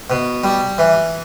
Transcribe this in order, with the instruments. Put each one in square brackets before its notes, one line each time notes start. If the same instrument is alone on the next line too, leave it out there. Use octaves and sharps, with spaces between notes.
[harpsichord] B2
G3
E3